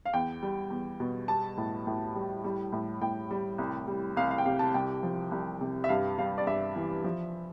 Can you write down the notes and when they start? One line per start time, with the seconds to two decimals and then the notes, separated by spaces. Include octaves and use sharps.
0.05 F5
0.13 E2 G5
0.43 G3
0.70 E2
1.00 B2
1.28 G3 A5
1.57 A2
1.87 A2
2.15 G3
2.44 G3
2.72 A2
3.01 A2 G5
3.31 G3
3.58 C2
3.88 G3
4.17 C2 F5
4.31 F5
4.38 G5
4.45 C3 F5
4.59 A5
4.74 C2 G5
5.03 F3
5.32 C2
5.61 C3
5.84 E5
5.89 G2 F5
6.18 G3 F5
6.38 D5
6.47 G2 E5
6.76 E3
7.04 F3